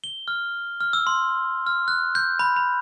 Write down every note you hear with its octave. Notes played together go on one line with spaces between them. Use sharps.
G7
F6
F6
E6
C6
F6
F#6
G6
B5
B5